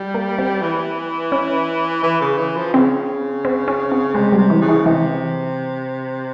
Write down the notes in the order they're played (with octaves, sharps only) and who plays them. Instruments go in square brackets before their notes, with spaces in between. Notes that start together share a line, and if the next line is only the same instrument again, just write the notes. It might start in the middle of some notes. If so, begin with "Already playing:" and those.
Already playing: [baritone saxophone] G3
[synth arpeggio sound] A#3
C4
[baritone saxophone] E3
[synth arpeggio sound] C#4
[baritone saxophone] E3
C#3
E3
F3
[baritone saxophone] C#3 [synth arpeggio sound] C4
[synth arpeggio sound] C4
C#4
C4
[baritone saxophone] C3 [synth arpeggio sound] G#3
[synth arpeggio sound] G3
[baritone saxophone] C3
[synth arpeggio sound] E3
[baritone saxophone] C#3
[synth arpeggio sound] E3
[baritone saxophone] C3 [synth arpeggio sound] E3